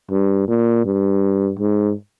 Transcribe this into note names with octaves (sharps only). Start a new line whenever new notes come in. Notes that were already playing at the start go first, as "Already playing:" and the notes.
G2
A#2
G2
G#2